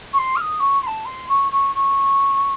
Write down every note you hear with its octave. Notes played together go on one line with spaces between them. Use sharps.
C#6
C6
F6
D#6
C#6
C6
A5
C6
C#6
C#6
C#6